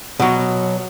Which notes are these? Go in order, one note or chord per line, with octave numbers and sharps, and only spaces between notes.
B2 F#3